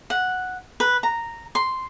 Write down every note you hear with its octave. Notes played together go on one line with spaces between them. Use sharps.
F#5
B4
A#5
C6